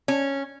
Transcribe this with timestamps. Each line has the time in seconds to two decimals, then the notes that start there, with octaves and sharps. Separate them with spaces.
0.08 C#4